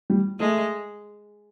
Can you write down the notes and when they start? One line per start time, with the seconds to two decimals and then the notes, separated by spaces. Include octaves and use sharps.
0.10 G3
0.40 G#3 A3